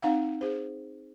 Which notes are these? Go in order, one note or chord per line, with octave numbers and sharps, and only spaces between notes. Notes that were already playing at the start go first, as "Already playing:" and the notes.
C4 D#4 F5 F#5
G#4 C5